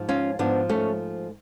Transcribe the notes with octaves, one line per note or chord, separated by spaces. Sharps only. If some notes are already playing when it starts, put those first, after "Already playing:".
Already playing: G#2 F3
C#4 F4
G#2 F3 B3 D4
A3 C#4